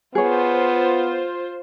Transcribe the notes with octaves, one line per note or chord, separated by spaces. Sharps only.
B3 F4 G#4 C5 C#5